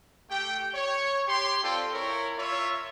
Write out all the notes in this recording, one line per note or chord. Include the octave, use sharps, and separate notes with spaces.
A3 G4 G5
C#5
G4 C6
C4 F4 A4 D5 G5
E4 A#4 C#5
F4 C#5 E5